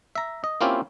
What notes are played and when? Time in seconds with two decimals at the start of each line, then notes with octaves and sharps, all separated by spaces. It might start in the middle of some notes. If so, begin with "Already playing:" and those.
0.15 E5 A#5
0.44 D#5
0.61 A#3 C4 C#4 E4 F4 G4